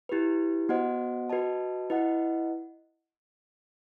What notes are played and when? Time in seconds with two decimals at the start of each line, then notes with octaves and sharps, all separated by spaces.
0.09 E4 G4 B4
0.69 B3 F#4 C5 D#5 F#5
1.30 F#4 B4 D#5 A5
1.90 E4 B4 D#5 F#5